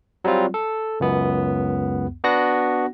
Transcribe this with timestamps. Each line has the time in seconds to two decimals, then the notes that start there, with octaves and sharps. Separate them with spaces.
0.24 F#3 G3 C4 F4
0.54 A4
1.00 C#2 F#2 B3
2.24 B3 D4 F#4 F#5 A#6